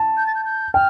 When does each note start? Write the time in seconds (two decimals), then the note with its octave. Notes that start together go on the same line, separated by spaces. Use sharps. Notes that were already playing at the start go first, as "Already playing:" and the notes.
Already playing: A5
0.17 G6
0.27 A6
0.35 G6
0.45 G6
0.74 G5 F6